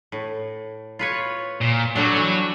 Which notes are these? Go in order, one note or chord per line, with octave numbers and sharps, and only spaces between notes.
A2
F4 B4 C#5
A#2
F#3 G3 A3 D4 F#4
E3